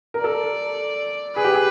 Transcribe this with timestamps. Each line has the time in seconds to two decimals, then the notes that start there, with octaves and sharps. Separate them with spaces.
0.14 A#4
0.24 A4 D5
1.36 G#4 B4
1.44 G4
1.54 G#4